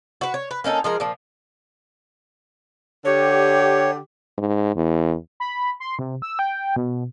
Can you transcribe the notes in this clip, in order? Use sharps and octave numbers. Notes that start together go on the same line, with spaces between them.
F#4 B4
C#5
B4
A#3 C#4 D#4 A4
F3 G#3 A#4
A#2 F3
D3 G4 C#5
G#2
E2
B5
C6
C3
E6
G5
B2